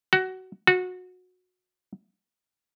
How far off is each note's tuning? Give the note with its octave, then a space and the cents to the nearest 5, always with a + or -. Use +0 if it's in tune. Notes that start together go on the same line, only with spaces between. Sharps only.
F#4 +20
F#4 -20